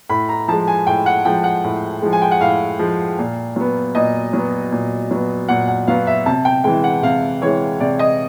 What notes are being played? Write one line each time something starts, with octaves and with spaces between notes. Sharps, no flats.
A2 B5
A#5
F3 G#3 A5
G#5
A2 G5
F#5
F3 G#3 G5
F#5
A2
F3 G#3
G#5
G5
F#5
A2 F5
F3 G#3
A#2
F#3 B3
A#2 D#5
F#3 B3
A#2
F#3 B3
A#2 F#5
F#5
F#3 B3 F5
E5
C3 A5
G5
E3 G#3 G5
F#5
C3 F5
E3 G#3 C#5
C3 D5
D#5